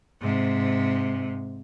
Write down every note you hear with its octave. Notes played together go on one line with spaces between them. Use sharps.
G#2 C3